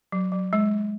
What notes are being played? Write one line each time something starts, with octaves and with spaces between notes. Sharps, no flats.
F#3
F#3
G#3